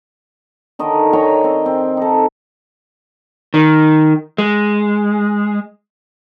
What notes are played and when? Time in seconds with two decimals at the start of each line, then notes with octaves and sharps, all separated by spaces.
0.79 D3 D#3 D#5
1.13 C#5 G5 G#5 A#5
1.44 C4
1.66 C4
1.97 D#4 A4
3.54 D#3
4.38 G#3